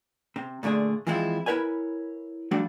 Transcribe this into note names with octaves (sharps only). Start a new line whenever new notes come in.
C3
A#2 D3 A3 D4 G#4
E3 F3 G#3 C4 E4 F4
E4 A#4 B4 C#5 G#5
F3 G3 A3 D4 F#4